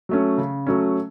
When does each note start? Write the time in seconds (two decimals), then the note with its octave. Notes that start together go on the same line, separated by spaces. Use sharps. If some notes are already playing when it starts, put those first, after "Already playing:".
0.09 F#3 A3 C#4
0.38 C#3
0.67 F#3 A3 C#4